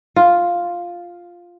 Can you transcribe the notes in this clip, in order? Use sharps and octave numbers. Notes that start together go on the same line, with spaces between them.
F4